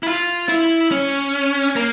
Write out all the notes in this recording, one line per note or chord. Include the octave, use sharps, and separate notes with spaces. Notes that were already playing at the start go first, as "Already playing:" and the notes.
E4
F4
E4
C#4
A#3